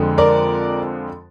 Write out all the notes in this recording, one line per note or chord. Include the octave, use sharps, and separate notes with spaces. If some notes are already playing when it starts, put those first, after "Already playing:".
Already playing: F2 D3 F3 G#3
A#4 D5